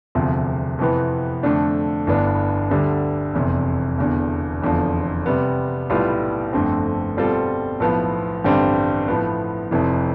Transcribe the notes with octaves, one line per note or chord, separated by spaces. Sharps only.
E1 D2 C3 F3
F2 C3 E3 B3
F2 D3 A3 D4
G1 G2 E3 B3 D4
D2 D3 G3
F1 E2 C3
E1 E2 D3
F1 E2 D3 F3
C3 G3 B3
B1 A2 G3 B3 F4
G1 F2 D3 A3 C4
B2 G3 C4 F4 A4
B1 A2 F3 B3
A1 G2 D3 G3 C4
A2 F3 B3
F1 F2 C3 E3